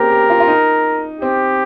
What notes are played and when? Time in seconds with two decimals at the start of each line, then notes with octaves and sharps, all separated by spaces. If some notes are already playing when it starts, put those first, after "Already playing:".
Already playing: A#3 C4 C#4 G4 G#4 A#4
0.11 G4
0.30 F4
0.40 F4
0.48 D#4
1.21 C4 G4